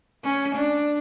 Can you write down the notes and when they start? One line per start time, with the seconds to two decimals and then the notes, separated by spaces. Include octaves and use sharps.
0.24 C#4
0.55 D4